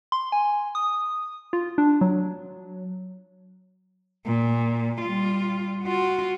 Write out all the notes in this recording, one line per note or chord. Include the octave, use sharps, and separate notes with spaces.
C6
G#5
D#6
F4
D4
F#3
A#2
G3 F4
F4 F#4